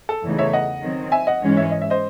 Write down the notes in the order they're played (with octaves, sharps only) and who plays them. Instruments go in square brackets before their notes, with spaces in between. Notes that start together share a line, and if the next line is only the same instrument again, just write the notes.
[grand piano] A4
[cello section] E2 C#3 E3 A3 D#4
[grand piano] C#5 E5
D#5 F#5
[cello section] D#3 F#3 C4
[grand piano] E5 G#5
D#5 F#5
[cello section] G#2 E3 G#3 C#4
[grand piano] C#5 E5
D#5
E5
C5 D#5